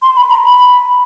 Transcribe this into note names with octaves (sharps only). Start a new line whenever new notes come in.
C6
B5
A#5
B5